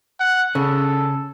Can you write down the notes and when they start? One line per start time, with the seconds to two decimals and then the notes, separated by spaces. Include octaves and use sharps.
0.20 F#5
0.55 C#3 A4